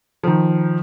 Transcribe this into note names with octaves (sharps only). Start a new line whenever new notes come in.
D#3 F3